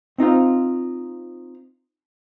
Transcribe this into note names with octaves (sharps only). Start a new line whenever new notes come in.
C4 D#4 F4 C5